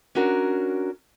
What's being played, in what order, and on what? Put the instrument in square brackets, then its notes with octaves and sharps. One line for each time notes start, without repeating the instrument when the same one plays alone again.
[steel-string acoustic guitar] C#4 D4 F#4 A#4